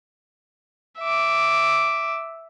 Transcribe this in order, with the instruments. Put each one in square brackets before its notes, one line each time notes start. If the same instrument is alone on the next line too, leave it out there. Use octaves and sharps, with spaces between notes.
[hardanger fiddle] E5 D6